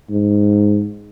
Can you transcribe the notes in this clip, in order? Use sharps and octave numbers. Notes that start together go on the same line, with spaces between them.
G#2